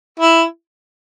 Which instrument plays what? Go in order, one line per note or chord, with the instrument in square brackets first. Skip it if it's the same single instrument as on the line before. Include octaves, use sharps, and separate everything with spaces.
[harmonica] E4